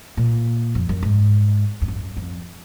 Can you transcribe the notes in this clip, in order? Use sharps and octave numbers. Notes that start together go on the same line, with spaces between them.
A#2
F2
F#2
G#2
F2
F#2
F2